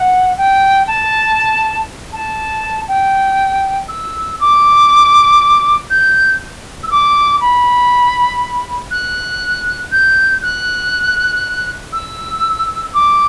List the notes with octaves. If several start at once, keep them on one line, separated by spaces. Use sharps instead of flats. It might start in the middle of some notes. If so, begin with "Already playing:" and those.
Already playing: F#5
G5
A5
A5
G5
E6
D6
G6
E6
D6
B5
F#6
G6
F#6
E6
D6